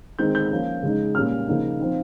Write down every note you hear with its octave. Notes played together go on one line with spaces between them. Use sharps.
D#3 G#3 C4 D#4 G6
G6
F3 A#3 C#4
C#3 G#3 D#4
A#2 G3 C#4 F6
C#3 F3 A#3 D#4
F3 C4 D#4